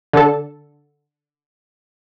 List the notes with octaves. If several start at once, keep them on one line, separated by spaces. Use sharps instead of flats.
D3 A4